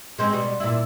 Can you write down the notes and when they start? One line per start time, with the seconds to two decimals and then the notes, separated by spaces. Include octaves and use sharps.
0.19 G#3 C4 C#4
0.32 B2 G3 C4
0.60 A#2 E4